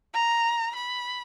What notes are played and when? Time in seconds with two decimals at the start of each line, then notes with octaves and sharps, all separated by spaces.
0.14 A#5
0.76 B5